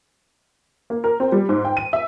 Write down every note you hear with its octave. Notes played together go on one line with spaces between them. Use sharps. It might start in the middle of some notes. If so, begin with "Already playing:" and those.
A#3
A#4
C4
G3
G#2
G5
D#7
E5